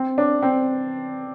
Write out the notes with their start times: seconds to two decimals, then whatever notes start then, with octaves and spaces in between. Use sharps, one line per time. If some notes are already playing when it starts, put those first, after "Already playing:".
Already playing: C4
0.18 D4
0.42 C4